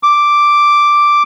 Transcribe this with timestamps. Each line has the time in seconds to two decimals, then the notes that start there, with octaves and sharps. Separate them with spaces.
0.03 D6